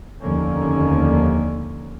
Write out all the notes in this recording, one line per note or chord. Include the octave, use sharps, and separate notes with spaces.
F1 D#2 D3 F3 A#3 C#4